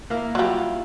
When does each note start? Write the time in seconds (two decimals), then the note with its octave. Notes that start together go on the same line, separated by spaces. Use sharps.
0.10 A#3 E4 A#4
0.35 F#3 G3 E4 F4